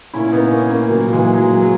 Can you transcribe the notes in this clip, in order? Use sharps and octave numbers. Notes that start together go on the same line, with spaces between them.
A#2 C#4 E4
B3 D#4
A#3 C#4
A#3 C#4
A#2 F#3 A#3
F#3
E3 G#3
G#3
F#3
F#3